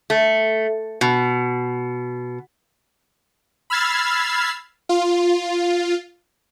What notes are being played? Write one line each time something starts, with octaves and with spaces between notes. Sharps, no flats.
A3
B2
B5 E6 F6 G#6 A6 C7
F4